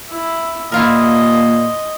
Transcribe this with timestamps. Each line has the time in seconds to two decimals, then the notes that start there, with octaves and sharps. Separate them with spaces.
0.10 E4
0.72 A#2 E4 F4 A#4 D#5